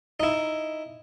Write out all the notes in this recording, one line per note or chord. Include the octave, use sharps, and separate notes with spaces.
D#4 E4